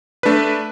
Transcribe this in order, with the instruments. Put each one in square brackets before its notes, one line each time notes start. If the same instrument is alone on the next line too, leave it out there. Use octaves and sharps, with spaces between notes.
[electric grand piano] A3 D4 B4